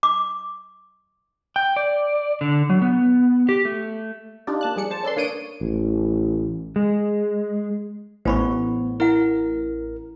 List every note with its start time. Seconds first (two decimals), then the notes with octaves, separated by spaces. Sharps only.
0.03 D6
1.56 G5
1.76 D5
2.41 D3
2.70 F#3
2.82 B3
3.49 G4
3.65 A3
4.47 D4 D#4 F4 G4 D5
4.61 A#3 A5 F#6
4.76 F3 G3 G#4 D5 C#7
4.91 C5 A5
5.03 C#4 A4 B4 D5 C6
5.16 A#3 D4 C#5 D#6 D7 D#7
5.61 A1
6.76 G#3
8.25 A1 B3 C5 B5 C#6
9.00 E4 A#4 F#5